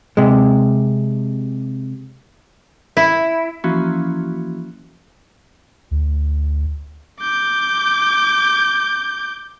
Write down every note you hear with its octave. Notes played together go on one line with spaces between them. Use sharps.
C3 G#3
E4
E3 F3 A#3 C#4 E4 F#4
D2
D6 G6